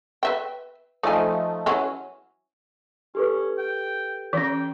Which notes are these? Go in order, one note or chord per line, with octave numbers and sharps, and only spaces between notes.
B4 E5 G5
F3 A3 D#4 D5 G#5
E3 F#3 C#4
C#4 G4 A4 B4
G5
E3 C#4 G5